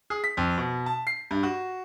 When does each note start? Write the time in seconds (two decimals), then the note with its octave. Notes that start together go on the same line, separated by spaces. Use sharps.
0.10 G#4
0.24 B6
0.37 F2
0.58 B2
0.86 A5
1.07 C7
1.31 G2
1.43 F#4